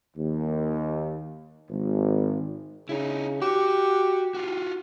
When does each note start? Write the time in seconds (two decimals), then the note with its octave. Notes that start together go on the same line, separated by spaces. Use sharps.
0.17 D#2
1.69 G#1
2.89 C#3 D#4 E4
3.42 F#4 G4
4.34 F4 F#4